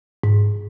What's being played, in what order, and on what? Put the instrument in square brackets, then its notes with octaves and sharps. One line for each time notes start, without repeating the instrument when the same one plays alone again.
[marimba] G#2